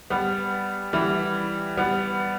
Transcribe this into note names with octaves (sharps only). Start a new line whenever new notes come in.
G3 B3
E3 G3
G3 B3